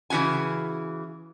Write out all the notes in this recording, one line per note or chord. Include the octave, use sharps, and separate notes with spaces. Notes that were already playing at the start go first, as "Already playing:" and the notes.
C#3 E3 E4 F#4 G#5